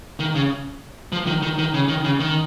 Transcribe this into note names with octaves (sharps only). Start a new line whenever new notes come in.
D#3
C#3
F3
D#3
D#3
D#3
C#3
D#3
C#3
D#3